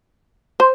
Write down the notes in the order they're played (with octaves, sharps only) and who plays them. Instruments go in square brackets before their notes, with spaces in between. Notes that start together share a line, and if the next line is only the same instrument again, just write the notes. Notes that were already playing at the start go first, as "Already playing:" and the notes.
[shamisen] C5